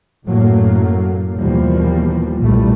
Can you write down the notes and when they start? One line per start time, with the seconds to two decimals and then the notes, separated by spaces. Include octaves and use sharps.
0.25 F#2 A2 F#3 A3 A#3
1.36 D#2 B2 E3 F3 G3 A#3
2.39 B1 A#2 E3 G3 A3